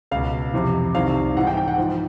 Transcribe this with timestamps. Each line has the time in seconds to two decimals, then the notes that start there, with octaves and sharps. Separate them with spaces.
0.11 C#2 B2 F5
0.53 F2 C3 E3
0.95 C2 C3 D#3 F5
1.37 G#2 E3 F#5
1.47 G5
1.57 G5
1.68 F#5
1.78 G#2 F3